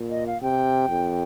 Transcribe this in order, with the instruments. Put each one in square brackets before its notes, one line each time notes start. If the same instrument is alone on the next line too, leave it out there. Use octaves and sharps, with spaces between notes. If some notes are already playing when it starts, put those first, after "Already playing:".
Already playing: [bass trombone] A#2
[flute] D#5
F5
[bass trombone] C3 [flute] G5
[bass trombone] F2